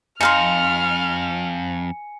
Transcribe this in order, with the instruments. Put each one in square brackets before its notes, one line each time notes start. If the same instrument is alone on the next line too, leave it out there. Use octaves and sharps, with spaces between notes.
[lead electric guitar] F2 [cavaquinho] D#4 F5 C6 [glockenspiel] G#5 C#7 [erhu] F6